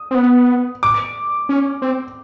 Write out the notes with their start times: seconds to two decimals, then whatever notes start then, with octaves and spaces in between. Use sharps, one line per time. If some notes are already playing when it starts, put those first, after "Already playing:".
Already playing: D#6
0.11 C4
0.15 B3
0.83 D6
1.49 C#4
1.82 C4